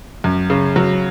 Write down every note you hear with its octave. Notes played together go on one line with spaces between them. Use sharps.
F#2
C#3
F#3